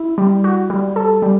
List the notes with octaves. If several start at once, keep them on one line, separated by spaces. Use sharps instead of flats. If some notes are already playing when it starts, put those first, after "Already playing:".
Already playing: E4
G3
F#4
G3
A4
G3